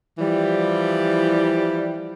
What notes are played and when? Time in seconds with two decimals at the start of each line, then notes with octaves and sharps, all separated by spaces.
0.18 E3 F3 G3 G4